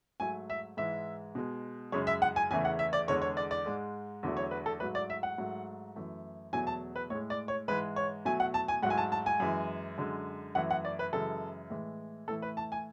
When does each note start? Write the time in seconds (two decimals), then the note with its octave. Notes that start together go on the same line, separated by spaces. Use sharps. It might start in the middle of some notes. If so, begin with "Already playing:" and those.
0.20 G#2 F#3 A3 G#5
0.50 E5
0.77 G#2 E3 G#3 E5
1.35 B2 G#3
1.92 F#2 C#3 G#3 C#5
2.07 E5
2.22 F#5
2.36 G#5
2.51 E2 C#3 E3 A3 G#5
2.65 F#5
2.79 E5
2.93 D5
3.08 E2 D3 G#3 C#5
3.22 C#5
3.37 D5
3.51 D5
3.66 G#2 G#3
4.23 E2 D3 F#3 A3
4.37 C#5
4.51 B4
4.66 A4
4.80 G#2 F#3 A3 B4
4.95 D5
5.10 E5
5.23 F#5
5.38 G#2 F#3 A3
5.96 F#2 E3 A3
6.53 E2 B2 F#3 A3 G#5
6.67 A5
6.96 B4
7.10 A2 G#3 C#5
7.30 D5
7.48 C#5
7.68 G#2 E3 G#3 B4
7.96 C#5
8.25 B2 F#3 A3 G#5
8.40 F#5
8.54 A5
8.68 G#5
8.83 G#2 F#3 A3 F#5
8.90 G#5
8.98 A5
9.12 A5
9.26 G#5
9.40 F#2 E3 G#3
9.98 F#2 D3 G#3
10.55 F#2 E3 A3 F#5
10.71 F#5
10.85 D5
10.99 B4
11.13 F#2 C#3 E3 G#3 A4
11.70 A2 E3 G#3
12.28 A2 E3 A3 A4
12.42 B4
12.57 A5
12.72 G#5